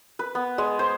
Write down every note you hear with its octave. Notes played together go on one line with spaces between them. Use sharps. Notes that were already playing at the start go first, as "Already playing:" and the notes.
B4
B3
G#3
C5